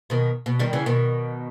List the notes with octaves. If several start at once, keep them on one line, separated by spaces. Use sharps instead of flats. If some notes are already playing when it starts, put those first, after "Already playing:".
B2 D#3
B2
D#3 G3
C#3 E3
B2 D#3